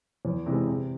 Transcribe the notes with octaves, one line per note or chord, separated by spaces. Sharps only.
E2
C3 E3 G#3
C3